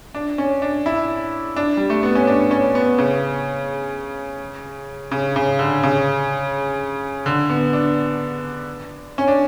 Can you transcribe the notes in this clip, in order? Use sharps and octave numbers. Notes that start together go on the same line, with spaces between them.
D4
C#4
D4
E4
D4
G3
A3
B3
C#4
D4
C#4
B3
C#3
C#3
C#3
D3
C#3
D3
B3
D4
C#4
D4